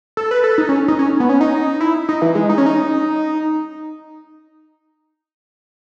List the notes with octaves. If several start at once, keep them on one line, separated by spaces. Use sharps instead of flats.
A4
B4
A4
D#4
C#4
D#4
C#4
B3
C#4
D#4
E4
D#4
E3
G#3
D#4
C#4
D#4